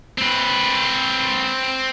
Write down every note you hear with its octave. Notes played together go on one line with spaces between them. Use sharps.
C4 B4